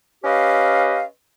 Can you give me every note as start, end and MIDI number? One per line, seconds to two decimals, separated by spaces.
0.24 1.03 61
0.24 1.03 67
0.24 1.03 71
0.24 1.03 75
0.24 1.03 77